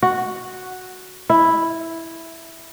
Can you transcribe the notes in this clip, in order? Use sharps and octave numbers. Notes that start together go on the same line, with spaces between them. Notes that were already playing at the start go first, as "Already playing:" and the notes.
F#4
E4